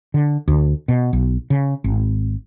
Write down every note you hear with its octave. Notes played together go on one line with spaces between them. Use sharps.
D3
D2
B2
B1
C#3
G#1